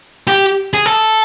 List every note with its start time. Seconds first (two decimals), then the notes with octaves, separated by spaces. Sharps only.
0.28 G4
0.74 G#4
0.86 A4